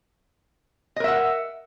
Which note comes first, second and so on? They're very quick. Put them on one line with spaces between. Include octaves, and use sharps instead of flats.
D#5 A#4 E5 F#5